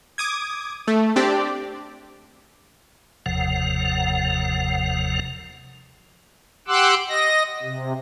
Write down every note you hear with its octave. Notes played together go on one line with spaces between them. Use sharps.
D6 D#6 G#6
A3
C4 D4 G4 D5
F#1 D#2 C3 F3 F#5
G4 F#5 C6 D6 E6 F#6
D#5 A#6
C3